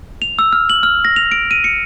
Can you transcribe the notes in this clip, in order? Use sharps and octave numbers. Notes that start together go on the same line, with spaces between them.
F7
E6
F6
F#7
F6
A#6
F7
D7
D#7
C#7